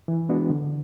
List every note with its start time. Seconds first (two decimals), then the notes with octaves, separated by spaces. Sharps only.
0.08 E3
0.29 G#3 B3 D4 F#4
0.50 D3